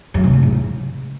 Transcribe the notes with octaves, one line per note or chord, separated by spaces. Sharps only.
F#2
C3
F2
G#2
C#3